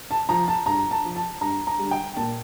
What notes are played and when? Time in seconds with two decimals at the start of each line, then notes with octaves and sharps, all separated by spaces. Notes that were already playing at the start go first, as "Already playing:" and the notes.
0.11 A5
0.29 F3 A#5
0.48 A5
0.66 G2 A#5
0.91 A5
1.04 F3
1.16 A5
1.41 G2 A#5
1.67 A#5
1.79 D3 G3
1.91 G5
2.16 A#2 A5